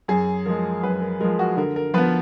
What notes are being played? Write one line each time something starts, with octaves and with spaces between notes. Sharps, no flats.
F#2 G#4
F3 G#3 A#4
F#2 B4
A#4
F3 G#3 A#4
F#4
D3 A#4
A#4
F3 B3 B4